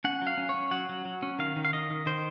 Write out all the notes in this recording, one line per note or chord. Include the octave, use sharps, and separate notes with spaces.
C#4 F#5
F#3 F5
C#4
C#5
C#4
F#3 F#5
F#3
F#3
C#4
D#3 F5
D#3
F5
D#3 D#5
D#3
D#3 C5